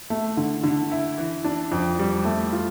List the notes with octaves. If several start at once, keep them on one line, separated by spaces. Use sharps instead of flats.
A3
D3
D3
E4
E3
D4
F2
G3
A3
F4